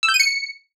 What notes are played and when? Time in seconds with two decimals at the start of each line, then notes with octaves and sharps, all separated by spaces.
0.03 E6
0.09 G6
0.14 D#7
0.20 C#7